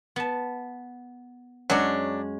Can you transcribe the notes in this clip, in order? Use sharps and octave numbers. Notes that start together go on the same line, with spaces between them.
B3 A5
F#2 F#3 G#3 C#4 D4